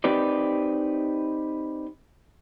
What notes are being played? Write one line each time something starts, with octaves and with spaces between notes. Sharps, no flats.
C4 D#4 G4 B4 D5